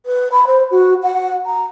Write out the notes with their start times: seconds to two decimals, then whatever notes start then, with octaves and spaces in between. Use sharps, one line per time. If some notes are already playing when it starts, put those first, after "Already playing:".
0.05 B4
0.31 B5
0.46 C5
0.70 F#4
1.02 F#5
1.46 A#5